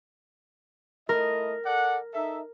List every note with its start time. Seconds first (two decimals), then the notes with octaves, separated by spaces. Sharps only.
1.09 A3 E4 A#4 D#5
1.66 A4 D5 F#5
2.14 D#4 A4 E5